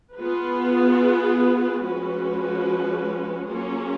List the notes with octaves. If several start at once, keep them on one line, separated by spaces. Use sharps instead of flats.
B3 F4 G#4 B4
F3 G#3 C#4 F#4 B4
F#3 A#3 C#4 F4 G#4